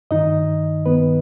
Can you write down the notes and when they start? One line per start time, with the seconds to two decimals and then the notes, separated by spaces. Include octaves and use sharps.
0.11 G2 D#3 D#4 D#5
0.86 G2 D#3 B3 B4